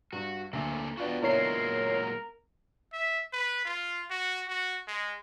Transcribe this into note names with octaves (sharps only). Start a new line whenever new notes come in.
G2 F#4
D2 A#3 D4 A4
B3 D4 F4 F#4 B4 G5
A#2 F#3 G#3 E4 A#4 C#5 C7
E5
B4
F4
F#4
F#4
G#3